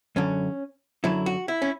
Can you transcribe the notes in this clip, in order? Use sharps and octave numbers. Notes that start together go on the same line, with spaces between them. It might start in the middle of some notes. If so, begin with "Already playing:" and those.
F#2 D3 F#3 C#4
F#2 D3 F#3 E4
F#4
E4
C#4